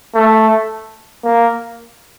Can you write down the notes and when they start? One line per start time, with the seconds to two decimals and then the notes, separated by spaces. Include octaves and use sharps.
0.15 A3
1.24 A#3